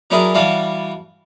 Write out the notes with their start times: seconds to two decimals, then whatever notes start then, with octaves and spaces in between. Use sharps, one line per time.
0.10 F#3 C#4 D4 E4 G#4 A#4
0.34 E3 G3 E4 F#4 F5 A5